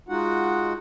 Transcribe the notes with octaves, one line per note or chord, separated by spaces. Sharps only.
G#3 D#4 F4 F#4 F#5